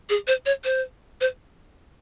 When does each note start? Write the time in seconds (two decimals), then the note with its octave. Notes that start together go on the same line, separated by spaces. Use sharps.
0.10 G#4
0.27 C5
0.46 C#5
0.64 C5
1.21 C5